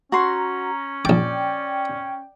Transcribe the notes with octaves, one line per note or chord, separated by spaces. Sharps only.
C#4 F#4 A#5 C6
A#1 D5 G5 D6